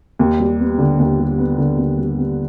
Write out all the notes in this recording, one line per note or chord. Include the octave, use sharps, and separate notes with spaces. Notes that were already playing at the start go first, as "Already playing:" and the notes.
D#2
G3
B3
D3
D#2
G3
B3
D3
D#2
G3
B3